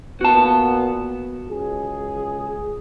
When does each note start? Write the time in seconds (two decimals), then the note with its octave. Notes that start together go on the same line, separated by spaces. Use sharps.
0.21 A#2 B3 F#4 A5
1.49 C#2 G#4